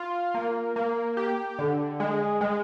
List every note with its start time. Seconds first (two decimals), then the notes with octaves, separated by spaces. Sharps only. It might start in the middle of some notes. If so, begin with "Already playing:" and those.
Already playing: F4
0.34 A#3
0.76 A#3
1.17 G4
1.59 D3
2.00 G#3
2.41 G#3